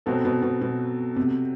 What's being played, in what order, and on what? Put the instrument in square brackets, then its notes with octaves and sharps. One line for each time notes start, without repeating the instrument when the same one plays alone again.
[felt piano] B2 [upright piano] F#3 C4 F#4 A4
[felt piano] B2
B2
B2
C3